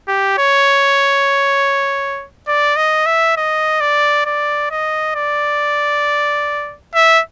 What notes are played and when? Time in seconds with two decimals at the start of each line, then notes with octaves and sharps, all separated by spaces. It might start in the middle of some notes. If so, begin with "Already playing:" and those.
0.08 G4
0.38 C#5
2.48 D5
2.77 D#5
3.06 E5
3.37 D#5
3.81 D5
4.26 D5
4.71 D#5
5.15 D5
6.95 E5